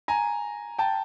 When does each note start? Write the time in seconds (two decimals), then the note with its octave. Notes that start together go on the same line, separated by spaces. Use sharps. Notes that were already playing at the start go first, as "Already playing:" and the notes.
0.08 G#5 A#5
0.79 G5 A5